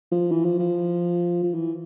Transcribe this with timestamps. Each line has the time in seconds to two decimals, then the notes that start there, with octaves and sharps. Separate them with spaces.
0.12 F3
0.31 E3
0.45 F3
0.59 F3
1.43 F3
1.54 E3